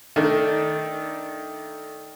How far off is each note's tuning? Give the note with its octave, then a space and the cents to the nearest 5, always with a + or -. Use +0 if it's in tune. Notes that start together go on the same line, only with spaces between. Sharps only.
D#3 +10 A3 +0 D4 -5